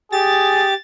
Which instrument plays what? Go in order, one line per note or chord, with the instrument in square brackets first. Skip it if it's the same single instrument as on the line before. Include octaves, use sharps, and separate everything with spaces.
[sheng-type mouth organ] G4 [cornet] G#4 [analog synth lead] A6